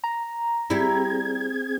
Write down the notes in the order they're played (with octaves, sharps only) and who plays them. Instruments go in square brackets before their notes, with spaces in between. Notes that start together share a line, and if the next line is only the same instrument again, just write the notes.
[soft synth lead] A#5
[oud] G3 E4 [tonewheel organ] C4 G#4 G#6